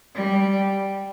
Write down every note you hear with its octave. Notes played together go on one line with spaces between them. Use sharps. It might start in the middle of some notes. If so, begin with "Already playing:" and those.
G3